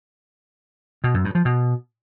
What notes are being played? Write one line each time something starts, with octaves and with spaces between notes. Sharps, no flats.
B2
F#2
G2
F3
B2